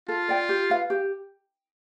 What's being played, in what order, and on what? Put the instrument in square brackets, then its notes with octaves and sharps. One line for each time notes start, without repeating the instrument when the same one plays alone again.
[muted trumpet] F4 [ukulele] A4
[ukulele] D5 G5
G4
B4 F5
G4